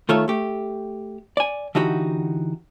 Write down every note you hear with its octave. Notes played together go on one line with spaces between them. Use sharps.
D#3 A3 F4 A4 C#5
A3 G4
D5 G#5
D3 E3 D#4 F#4 G4